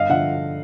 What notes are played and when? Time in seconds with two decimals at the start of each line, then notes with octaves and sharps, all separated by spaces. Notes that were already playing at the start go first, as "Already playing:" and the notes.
Already playing: G1 D#5 F5
0.09 D3 F3 E5 F#5